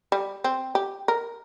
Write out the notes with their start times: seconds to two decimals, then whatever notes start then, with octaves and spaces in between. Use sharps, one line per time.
0.12 G3
0.44 C4
0.75 G4
1.08 A#4